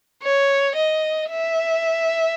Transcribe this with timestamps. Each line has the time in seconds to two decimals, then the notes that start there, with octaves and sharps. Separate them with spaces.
0.23 C#5
0.75 D#5
1.30 E5